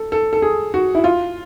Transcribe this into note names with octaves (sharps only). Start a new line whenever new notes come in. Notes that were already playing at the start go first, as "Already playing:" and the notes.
Already playing: A4
A4
A4
G#4
F#4
E4
F4